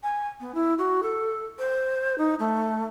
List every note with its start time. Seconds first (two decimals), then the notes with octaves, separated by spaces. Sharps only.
0.03 G#5
0.40 B3
0.54 E4
0.78 F#4
1.02 A4
1.59 C5
2.18 D#4
2.39 A3